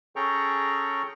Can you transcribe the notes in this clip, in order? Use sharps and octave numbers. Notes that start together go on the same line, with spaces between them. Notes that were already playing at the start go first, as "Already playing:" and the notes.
C#4 G#4 A4 G5 A#5 C#6